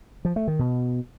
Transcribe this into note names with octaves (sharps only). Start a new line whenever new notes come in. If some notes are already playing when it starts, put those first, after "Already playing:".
F3
A3
D#3
B2